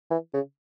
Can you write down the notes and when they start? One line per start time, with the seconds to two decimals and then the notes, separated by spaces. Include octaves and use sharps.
0.11 E3
0.34 C#3